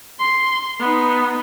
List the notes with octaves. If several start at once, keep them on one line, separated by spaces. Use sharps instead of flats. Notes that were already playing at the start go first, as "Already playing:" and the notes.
C6
B3 D#4